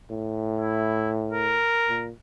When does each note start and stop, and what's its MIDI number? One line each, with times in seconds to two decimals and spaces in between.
0.10 1.63 45
0.58 1.10 64
1.31 2.06 70
1.89 2.11 46